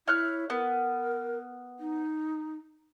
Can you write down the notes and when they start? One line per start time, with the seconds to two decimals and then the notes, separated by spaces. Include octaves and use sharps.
0.08 E4 C#5 F6 F#6
0.50 B3 A#4
1.80 D#4